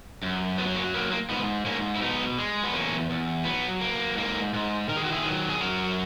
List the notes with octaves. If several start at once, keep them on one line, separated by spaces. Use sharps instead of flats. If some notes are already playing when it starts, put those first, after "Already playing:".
F#2
F#3 B3
A#3 C#4
A#3 B3
A#3
G#2 B3
G#2 A#3 C#4
E4
B2 B3 D#4
G#3
B3
E2 A#3 C#4
E2
F#3 B3
A#3
G#2 A#3
G#2
D#3 A#4
G#4
F#4
E4 G#4
F#3
G#4
F#2 F#4 A#4